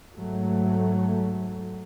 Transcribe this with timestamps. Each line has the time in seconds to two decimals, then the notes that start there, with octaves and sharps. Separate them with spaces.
0.13 G#2 F#3 A3